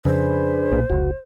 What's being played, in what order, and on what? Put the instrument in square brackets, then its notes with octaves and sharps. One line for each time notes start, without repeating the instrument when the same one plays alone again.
[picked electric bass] F2 C#3 [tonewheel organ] D4 G#4 B4 [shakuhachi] C5
[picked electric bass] B1 A#2
[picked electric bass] F1 C#2 [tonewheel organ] F#4